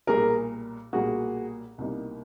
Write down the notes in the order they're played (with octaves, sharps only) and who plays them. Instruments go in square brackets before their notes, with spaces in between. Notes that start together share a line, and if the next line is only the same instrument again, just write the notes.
[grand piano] B1 A#2 G3 A#3 [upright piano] G#4 A#4
[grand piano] B1 A#2 G3 A#3 [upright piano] F#4 G#4
[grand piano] C2 B2 G3 A#3 D#4